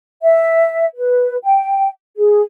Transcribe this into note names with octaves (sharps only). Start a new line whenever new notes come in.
E5
B4
G5
G#4